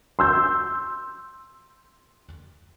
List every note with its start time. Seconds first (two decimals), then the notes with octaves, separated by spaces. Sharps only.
0.19 C6 E6 G6